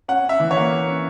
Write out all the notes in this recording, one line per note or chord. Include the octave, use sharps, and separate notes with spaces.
C#4 F#5
C#4 E5
E3
C#5
A#3
A#3
C#4